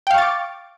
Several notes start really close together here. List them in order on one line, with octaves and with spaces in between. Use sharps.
G5 F5 C#6 A6 D6